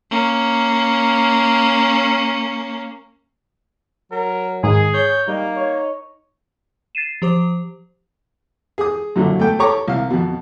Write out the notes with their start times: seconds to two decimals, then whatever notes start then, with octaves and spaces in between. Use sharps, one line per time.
0.11 A#3 C#4
4.11 F#3 A#4
4.63 G#2 D#3 G#4
4.94 C#5 G6
5.28 G3 A#3 D#4
5.56 C#5
6.95 A6 C7 D#7 E7
7.22 F3 G4 C5 D6
8.78 G#4 D#6
9.16 F#2 A#2 D3 F#3
9.39 A3 B3 G5
9.59 G4 A4 C#5 A#5 C#6 D6
9.88 C2 F5
10.10 F2 B2